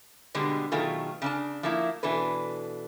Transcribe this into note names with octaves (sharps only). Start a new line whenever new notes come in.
B2 D3 G3 G#3 B3
B2 D#3 F#3 A3 F4 G#4
C#3 D4 A5
F3 A3 A#3 E4
B2 E3 D4 A4 B4